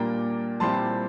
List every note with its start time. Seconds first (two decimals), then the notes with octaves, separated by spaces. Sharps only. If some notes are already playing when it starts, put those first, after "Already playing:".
Already playing: A#2 G3 A#3 D4 F4 G5 A#5
0.60 A#2 G3 C4 E4 A5 C6